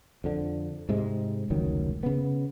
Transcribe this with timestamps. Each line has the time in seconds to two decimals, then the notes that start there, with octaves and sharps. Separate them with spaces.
0.24 F2 D3
0.89 G#2 C3 G#3
1.50 F1 C#2 D#3 F#3
2.03 C#3 B3